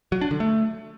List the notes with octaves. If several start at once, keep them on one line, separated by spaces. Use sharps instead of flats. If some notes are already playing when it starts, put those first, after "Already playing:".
F#3
D4
D3
A3